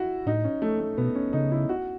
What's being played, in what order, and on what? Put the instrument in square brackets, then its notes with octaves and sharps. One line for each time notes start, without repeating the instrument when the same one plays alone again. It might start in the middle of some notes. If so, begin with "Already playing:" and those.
Already playing: [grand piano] E4 F#4
[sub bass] A2 [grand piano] D#4
[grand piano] C#4
A3
A3
[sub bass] B2 [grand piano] B3
[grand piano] C#4
[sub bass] C#3 [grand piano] D#4
[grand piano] E4
F#4